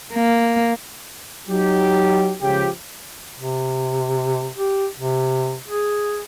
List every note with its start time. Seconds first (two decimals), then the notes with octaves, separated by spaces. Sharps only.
0.14 A#3
1.49 F#3 D#4 G4
2.42 C#2 C#3 F3 G4
3.38 C3
4.56 G4
5.00 C3
5.68 G#4